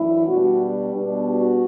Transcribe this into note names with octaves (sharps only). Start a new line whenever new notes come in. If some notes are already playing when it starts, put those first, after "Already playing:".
Already playing: F#2 E3 A3 D4 E4
B2 G3 D4 F#4
B2 G3 B3 D4
F#4